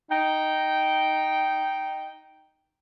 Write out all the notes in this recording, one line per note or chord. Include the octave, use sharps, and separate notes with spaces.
D#4 G5